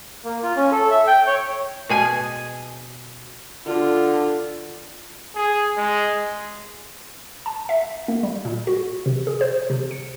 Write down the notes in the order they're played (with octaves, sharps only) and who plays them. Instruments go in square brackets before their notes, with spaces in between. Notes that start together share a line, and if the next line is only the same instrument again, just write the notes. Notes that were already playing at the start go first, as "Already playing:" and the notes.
[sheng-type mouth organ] A#3
F4
C#4
A4
E5
G5
C#5
[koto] B2 G#4 G#5
[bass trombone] D3 [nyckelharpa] F4
[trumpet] G#4
G#3
[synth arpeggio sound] A5
E5
A#3
G3
A#2
F#4
C3
G#4
C5
C3
C#7